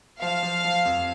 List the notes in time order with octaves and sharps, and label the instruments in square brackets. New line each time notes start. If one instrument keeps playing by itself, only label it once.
[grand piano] F3 [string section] F5
[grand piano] F3
F3
F2